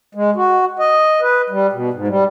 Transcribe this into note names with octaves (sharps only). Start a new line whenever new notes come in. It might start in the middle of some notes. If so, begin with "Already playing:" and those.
G#3
F#4
D#5
B4
G3
B2
G#2
G3